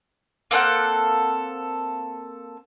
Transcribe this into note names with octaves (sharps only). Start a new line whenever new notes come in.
A#3 C4 A4 F#5